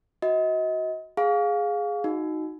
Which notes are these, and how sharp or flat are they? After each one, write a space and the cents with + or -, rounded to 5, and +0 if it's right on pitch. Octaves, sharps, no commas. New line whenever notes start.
F#4 +0 D#5 +30
G#4 +0 F5 +15
D#4 +0 F#4 -10